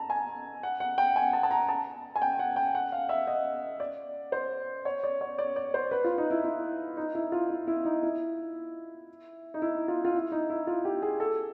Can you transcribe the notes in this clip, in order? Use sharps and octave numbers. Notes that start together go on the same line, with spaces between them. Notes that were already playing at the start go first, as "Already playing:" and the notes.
Already playing: A5 A#5
G#5
F#5
F#5
G5
G#5
A5
A5
A#5
A5
G#5
G5
F#5
G5
F#5
F5
E5
D#5
D5
C5
C#5
D5
C#5
D5
D5
C5
B4
F4
D#4
E4
E4
D#4
E4
F4
E4
E4
D#4
E4
D#4
E4
F4
F4
E4
D#4
E4
F4
G4
G#4
A4